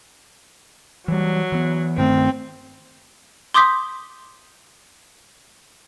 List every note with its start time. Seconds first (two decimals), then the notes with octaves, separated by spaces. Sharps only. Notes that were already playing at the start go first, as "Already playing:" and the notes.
1.08 E3 F#3 G3
1.52 E3 B3
1.98 G2 D#3 A3 C4
3.54 C6 D6 D#6 G6 B6